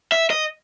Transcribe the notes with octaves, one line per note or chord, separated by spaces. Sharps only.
E5
D#5